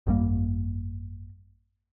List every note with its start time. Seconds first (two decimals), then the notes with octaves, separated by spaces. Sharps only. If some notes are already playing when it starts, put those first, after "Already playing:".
0.07 G#1 F#2 G3 A#3